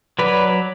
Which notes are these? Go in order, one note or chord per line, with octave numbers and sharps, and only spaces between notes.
F#3 B4 D5